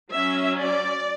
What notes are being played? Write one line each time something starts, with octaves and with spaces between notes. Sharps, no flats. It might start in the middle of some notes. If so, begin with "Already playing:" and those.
F#3 C#4 E5
D5